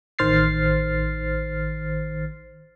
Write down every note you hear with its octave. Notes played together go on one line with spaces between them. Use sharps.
A1 D#3 C5 F6 A6 C7